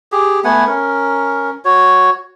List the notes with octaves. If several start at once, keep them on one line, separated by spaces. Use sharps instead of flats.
G4 G#4
A3 B3 F#5 G#5
C#4 A#4
F#4 C#5